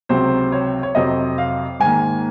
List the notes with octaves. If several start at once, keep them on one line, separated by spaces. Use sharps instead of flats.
C#2 C3 F#3 C4 C5
C#5
C#5
F2 C3 F#3 C4 D#5
F5
G#2 D#3 A#3 G#5